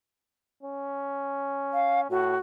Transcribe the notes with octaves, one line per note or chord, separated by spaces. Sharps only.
C#4
F5
A2 F#4